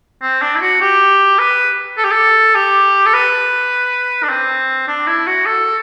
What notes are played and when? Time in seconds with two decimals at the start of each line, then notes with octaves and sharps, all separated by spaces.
0.22 C4
0.42 D4
0.56 E4
0.61 F#4
0.81 G4
1.39 B4
1.98 A4
2.04 G4
2.11 A4
2.55 G4
3.06 A4
3.14 B4
4.23 D4
4.30 C4
4.88 D4
5.07 E4
5.27 F#4
5.46 A4